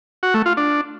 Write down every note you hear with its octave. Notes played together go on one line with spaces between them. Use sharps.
F#4
A3
F4
D4